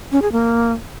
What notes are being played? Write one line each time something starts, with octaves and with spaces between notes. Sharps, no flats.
C#4
G#4
A#3